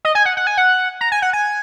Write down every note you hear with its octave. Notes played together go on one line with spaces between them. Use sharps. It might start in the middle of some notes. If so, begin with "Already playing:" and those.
D#5
G#5
F#5
F#5
G#5
F#5
A#5
G#5
F#5
G#5